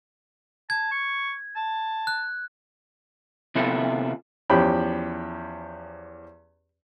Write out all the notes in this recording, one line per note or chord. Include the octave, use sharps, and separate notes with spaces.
A5 G#6
C#6
A5
F#6
C3 B3 E4 F4 A4
E2 F3 C#4 G4 B5